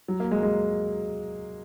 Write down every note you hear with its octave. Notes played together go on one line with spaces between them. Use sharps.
F#3
A#3
G#3
G#3